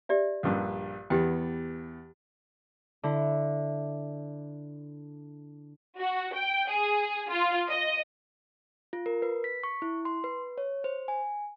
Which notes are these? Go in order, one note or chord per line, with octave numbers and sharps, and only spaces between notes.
G4 D5 E5
A#1 G2
E2 B3 G4 G5
D3 E4
F#4
G5
G#4
F4
D#5
F4
A#4
B4
B6
C#6
E4
C6
B4
C#5
C5
G#5